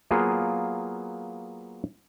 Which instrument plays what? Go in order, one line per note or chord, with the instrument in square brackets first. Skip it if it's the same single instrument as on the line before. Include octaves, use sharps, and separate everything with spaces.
[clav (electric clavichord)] F#3 A#3 B3 F4 G#4